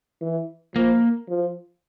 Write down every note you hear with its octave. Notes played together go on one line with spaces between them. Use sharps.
E3
F3 A#3
F3